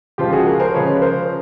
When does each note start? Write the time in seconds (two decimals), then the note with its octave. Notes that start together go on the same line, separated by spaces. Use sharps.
0.18 C#3 F3 G#3 F4 G4
0.32 F#4 G#4
0.46 G#4 A#4
0.60 A#4 C5
0.74 C#3 F3 G#3 B4 C#5
1.02 A#4 C5